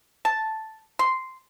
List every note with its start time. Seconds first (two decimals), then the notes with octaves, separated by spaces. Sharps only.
0.25 A5
0.99 C6